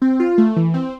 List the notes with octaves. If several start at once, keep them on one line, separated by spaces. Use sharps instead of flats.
C4
F4
A3
E3
C4